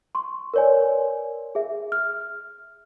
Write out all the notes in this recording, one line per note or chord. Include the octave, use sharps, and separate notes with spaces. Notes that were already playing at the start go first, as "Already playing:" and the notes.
C6 C#6
A#4 B4 C#5 D5 G#5
G#4 E5
F6